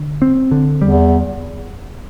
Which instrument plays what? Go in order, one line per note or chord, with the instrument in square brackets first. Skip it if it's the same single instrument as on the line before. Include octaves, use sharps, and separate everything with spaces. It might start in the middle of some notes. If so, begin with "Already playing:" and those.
Already playing: [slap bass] D3
C4
D3
[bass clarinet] E2 [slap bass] G3